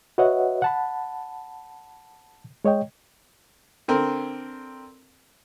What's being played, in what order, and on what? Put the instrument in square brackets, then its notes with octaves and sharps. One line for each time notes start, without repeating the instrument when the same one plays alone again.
[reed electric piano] F#4 B4 C#5 D#5 E5 F#5
F#5 A5 B5
G#3 C#5 D#5 G5
[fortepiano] D3 C4 A#4